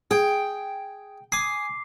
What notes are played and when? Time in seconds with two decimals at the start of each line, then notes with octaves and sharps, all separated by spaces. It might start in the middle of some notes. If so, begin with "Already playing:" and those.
0.11 G#4 G5
1.32 G#5 D6 D#6 C7